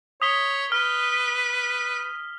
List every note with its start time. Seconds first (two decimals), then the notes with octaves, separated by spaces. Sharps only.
0.22 C#5 D#6 B6 G7
0.72 B4 F6